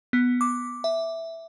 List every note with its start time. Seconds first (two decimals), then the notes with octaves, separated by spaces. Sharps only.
0.13 B3
0.41 D6
0.84 E5